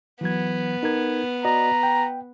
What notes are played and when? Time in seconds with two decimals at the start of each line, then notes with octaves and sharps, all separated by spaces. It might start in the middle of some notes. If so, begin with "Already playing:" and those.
0.21 E3 F#3 B3 G#6
0.83 D#4 A#4 G#6
1.45 F#4 D5 D#5 A#5
1.83 G5